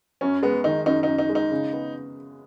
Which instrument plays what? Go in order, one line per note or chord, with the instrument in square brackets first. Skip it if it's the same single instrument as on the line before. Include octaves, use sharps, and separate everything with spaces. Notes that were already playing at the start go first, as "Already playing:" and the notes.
[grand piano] F#2 [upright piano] C#4
[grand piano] G#3 [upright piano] B3
[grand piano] D#3 [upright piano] D#4
[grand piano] F#2 [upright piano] D#4
[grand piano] F#2 [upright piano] D#4
[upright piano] D#4
[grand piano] G#3
[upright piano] D#4
[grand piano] C#3
B3